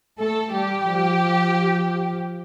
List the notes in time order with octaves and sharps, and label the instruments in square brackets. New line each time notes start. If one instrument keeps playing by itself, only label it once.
[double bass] A3 [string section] A4
[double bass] G3 [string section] G4
[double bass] F3